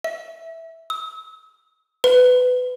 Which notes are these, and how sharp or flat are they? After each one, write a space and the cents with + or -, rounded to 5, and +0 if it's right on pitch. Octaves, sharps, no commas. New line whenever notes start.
E5 -10
E6 -40
B4 +20